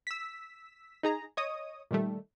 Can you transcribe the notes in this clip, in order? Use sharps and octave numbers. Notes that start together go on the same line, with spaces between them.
E6 B6
D#4 G#4 A#5
C#5 D#5 D#6
A#2 D#3 G3 A3